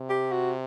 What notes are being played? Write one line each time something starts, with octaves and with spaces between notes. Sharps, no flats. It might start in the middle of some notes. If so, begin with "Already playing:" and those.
Already playing: C3
G4
F#4